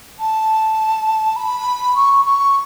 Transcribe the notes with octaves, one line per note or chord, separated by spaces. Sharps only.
A5
B5
C#6
C#6